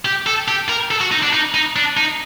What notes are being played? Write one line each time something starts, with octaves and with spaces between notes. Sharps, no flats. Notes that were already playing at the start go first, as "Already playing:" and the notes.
G4
A4
G4
A#4
A4
F#4
D#4
D4
D#4
D#4
D4
D#4